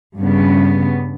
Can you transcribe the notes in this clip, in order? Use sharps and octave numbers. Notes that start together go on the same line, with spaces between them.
G2 C#3 B3